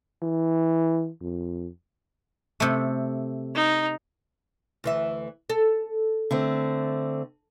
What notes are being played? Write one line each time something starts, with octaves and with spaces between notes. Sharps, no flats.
E3
F2
C3 A3
D#4
D2 E3 E5
A4
D3 A3 C4